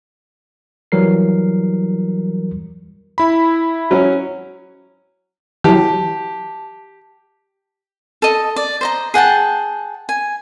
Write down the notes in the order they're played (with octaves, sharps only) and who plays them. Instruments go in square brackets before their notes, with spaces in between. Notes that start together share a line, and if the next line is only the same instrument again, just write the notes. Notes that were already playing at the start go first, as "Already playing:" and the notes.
[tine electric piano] E3 F#3 G3 A#4 C7
[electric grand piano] E4 B5
[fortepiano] F#3 C#4
[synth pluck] E3 F#3 [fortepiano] G4 [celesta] A5
[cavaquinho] A4 D#5
D5
C5 D#5 A#5
G#4 F#5 G5 A5
G#5